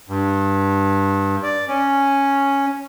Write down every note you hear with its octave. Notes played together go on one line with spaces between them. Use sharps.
G2
D5
C#4